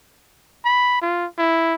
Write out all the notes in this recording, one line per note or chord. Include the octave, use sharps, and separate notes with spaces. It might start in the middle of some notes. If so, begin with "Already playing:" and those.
B5
F4
E4